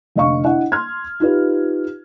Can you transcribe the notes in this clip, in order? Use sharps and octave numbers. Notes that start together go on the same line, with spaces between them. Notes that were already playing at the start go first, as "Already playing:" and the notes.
F1 D3 D#5 F5 C#6
D4 E4 D#5 F#5
C6 F6 G#6
D#4 F4 G4 B4